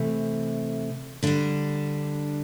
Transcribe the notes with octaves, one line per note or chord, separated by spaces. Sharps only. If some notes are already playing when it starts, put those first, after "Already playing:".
Already playing: C3 E3 A3
D3 G3 D4